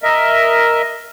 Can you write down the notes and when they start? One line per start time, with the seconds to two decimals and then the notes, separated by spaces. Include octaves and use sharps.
0.03 A#4 D#5 E5